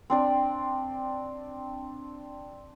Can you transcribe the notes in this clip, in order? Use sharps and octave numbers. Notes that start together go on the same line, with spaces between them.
C4 D4 D5